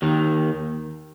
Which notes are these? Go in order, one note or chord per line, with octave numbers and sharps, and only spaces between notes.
D#2 D#3